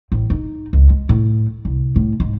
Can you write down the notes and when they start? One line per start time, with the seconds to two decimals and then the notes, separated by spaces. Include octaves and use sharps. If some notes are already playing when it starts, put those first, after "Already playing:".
0.12 A1
0.30 D#4
0.73 C#2
0.89 G#3
1.09 A2
1.65 C2
1.96 A2
2.20 G#2